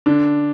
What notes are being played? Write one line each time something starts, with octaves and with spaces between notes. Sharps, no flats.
D3 D4